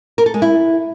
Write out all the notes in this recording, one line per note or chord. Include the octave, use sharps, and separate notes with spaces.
A#4
A4
G#3
E4